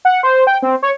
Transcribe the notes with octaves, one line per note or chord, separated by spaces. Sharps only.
F#5
C5
G5
C4
C#5